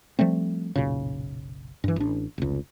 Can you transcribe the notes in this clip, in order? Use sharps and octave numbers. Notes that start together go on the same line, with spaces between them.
F3 G3 A3 C4
F#1 B1 A#2 C#3
G2 E3
A1 D4
F1 C#2